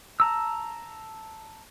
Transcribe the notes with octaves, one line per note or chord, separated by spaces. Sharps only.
A5 A#5 E6